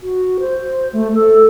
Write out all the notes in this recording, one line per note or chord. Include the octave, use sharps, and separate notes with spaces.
F#4
C5
A3
A4